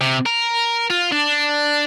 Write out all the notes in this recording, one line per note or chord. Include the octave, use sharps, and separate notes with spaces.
C3
A#4
F4
D4